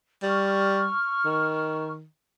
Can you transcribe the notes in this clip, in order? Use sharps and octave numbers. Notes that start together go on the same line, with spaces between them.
G3 C#6 F6
D#3